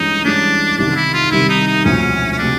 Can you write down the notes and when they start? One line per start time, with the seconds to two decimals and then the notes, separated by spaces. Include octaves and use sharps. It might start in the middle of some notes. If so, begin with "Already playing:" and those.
Already playing: G2 E3 G#3 C#4 D#4
0.24 G2 E3 G#3 C#4 D4
0.78 C2 C3 D#3 G3 D4
0.96 E4
1.13 F4
1.31 C2 C3 D#3 G3 E4
1.49 D#4
1.67 D#4
1.85 E1 D2 C3 F3 C#4
2.32 C#4
2.38 C3 F3 D4